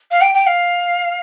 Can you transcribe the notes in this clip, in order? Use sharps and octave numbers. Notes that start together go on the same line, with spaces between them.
F5
G5
G5
F5